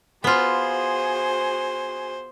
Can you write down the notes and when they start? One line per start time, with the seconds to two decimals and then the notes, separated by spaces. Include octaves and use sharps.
0.24 B3 F4 F#4 G#4 C5